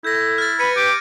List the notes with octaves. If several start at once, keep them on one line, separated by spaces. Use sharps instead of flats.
E4 A4 G6 A#6
F6 A6
B4 B5 G#6 C#7 D#7
G4 D6